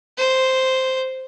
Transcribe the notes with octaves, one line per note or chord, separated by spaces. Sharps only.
C5